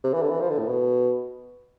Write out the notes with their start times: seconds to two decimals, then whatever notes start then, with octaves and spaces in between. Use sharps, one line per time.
0.04 C3
0.13 E3
0.22 D3
0.31 E3
0.41 F3
0.50 D3
0.59 A2
0.67 B2